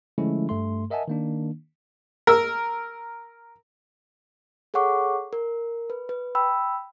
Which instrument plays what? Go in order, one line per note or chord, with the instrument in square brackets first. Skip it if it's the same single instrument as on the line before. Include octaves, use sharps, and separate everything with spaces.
[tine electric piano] D3 F3 G#3 A3 C#4 E4
G2 A3 C6
A#4 D#5 E5 F#5 G#5 A5
D#3 A#3 D4
[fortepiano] A#4 E6
[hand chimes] G#4 A4 C#5 F#5 C#6 D6
A#4
B4
B4
G5 B5 E6